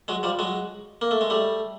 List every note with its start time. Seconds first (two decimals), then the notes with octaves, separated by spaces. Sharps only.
0.08 F#3 G#3
0.23 F3 G3
0.39 F#3 G#3
1.01 A#3
1.11 A3
1.21 G#3
1.30 G3 A3